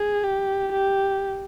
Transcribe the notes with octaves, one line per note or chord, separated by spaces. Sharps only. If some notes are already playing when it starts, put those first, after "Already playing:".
Already playing: G#4
G4
G4